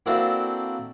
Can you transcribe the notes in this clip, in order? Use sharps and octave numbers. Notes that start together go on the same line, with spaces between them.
A#3 C4 D4 E4 F#4 A4